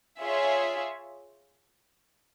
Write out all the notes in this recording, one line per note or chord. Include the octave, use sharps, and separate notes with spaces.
F4 G#4 C#5 E5